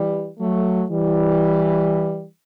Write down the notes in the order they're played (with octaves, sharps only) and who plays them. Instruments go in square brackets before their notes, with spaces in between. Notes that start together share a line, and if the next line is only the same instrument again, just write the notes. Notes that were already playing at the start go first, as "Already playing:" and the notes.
Already playing: [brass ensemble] E3 G3
F#3 A3
E3 G3